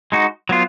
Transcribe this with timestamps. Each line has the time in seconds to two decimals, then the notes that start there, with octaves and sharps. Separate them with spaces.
0.12 G#3 D#4 F#4
0.49 F#3 B3 F4